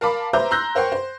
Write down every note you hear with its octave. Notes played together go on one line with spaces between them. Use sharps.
A#4 F5 A5 B5 D6
B4 C5 E5 A#5 D6 G6
A#5 C6 E6 F#6 G6 A#6
A#4 C5 C#5 F#5 G5 C6
C5